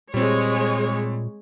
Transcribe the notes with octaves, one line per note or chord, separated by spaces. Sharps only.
A#2 G3 G#3 C4 C#5